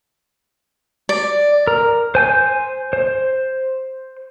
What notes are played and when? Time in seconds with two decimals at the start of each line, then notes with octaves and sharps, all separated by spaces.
1.09 D5
1.67 A#4
2.15 C5 G#5 G6
2.93 C5